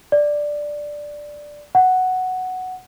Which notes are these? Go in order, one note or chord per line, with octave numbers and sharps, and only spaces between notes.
D5
F#5